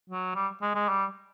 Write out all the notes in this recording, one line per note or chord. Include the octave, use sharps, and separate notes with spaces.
F#3
G3
G#3
G#3
G3